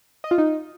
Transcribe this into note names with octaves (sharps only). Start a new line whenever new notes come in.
D#5
F4
D#4